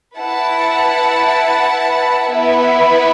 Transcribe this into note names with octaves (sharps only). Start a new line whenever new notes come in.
E4 B4 F#5 A5
B3 E4 B4 E5